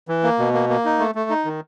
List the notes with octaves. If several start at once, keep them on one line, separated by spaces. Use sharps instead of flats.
E3
A#3
B2
A#3
A#3
D#4
A3
A3
D#4
D#3